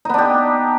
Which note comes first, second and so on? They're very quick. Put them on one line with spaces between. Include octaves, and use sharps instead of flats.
D#4 B3 D4 G4